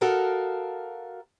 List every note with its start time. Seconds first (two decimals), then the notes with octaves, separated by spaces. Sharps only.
0.01 F#4 A4 A#4 D#5 F5 A5